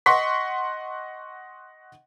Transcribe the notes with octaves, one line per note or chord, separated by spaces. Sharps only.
D#5 F#5 C6 C#6 B6